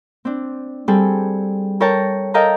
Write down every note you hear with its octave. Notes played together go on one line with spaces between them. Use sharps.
C4 D4
G3 C4 G#4 A4
A4 A#4 C#5 G5 A5 A#5
A4 A#4 D#5 F5 G5 A#5